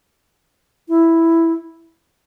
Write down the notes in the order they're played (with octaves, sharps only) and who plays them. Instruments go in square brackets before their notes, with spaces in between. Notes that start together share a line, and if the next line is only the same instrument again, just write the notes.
[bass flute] E4